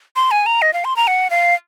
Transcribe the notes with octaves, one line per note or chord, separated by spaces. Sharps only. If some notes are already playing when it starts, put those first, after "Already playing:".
C6
G#5
A#5
D#5
F5
C6
A#5
F#5
F5